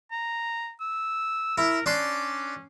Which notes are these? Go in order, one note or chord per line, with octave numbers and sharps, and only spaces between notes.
A#5
E6
E4 A#4
C#4 D4 C6